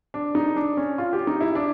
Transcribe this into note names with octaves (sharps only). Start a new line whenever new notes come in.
D4
D#4
D4
C#4
F4
G4
D#4
E4
D4